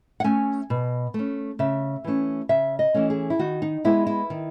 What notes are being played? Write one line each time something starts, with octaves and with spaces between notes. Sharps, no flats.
F#5
A3 C#4 G#5
B2
A3 C#4
C#3 E5
E3 A3 C#4
C#3 E5
D#5
E3 A3 C#4
G#4
E4
D#3 F#4
D#4
G#3 B3 E4
E4
D#3